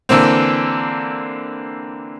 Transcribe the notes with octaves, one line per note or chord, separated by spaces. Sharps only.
D3 E3 A#3 C4